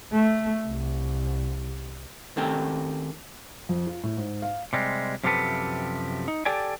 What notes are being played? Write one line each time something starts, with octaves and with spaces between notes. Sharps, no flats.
A3
C2
D#3 A3 C4 C#4 G4
F2
F4
A2
G#2
F5
C3 G3 G#3
F#2 C3 F3 G4 A4 B4
D#4
G4 A4 D5 G5 G#5